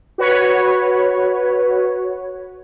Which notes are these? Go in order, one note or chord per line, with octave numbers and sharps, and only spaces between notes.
F#4 B4 C#5